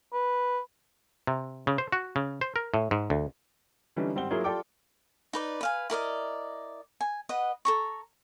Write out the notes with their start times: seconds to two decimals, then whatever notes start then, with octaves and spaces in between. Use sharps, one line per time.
0.13 B4
1.27 C3
1.67 C#3
1.78 C5
1.92 F#4
2.16 C#3
2.41 C5
2.56 A#4
2.74 A2
2.91 G#2
3.10 D2
3.96 D3 E3 G3 C#4 D#4
4.15 G#1 G3 C4 F#5 G7
4.31 F#3 A#3 E4 F4 G#4 C#5
4.44 F4 G4 A4 D5 G5 D6
5.33 D#4 B4 D5
5.61 B4 F5 G#5
5.90 E4 A#4 D5 D#5
7.01 G#5
7.29 B4 D#5 F#5
7.65 A4 A#5 C#6